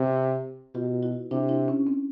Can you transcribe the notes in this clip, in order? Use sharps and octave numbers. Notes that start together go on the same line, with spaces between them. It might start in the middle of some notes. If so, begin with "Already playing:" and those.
Already playing: C3
B2 F4 G4
E4 F#4
C3 D4 E4
D4 E4
C#4
C4